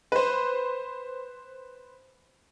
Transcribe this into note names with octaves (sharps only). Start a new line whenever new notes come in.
B4 C5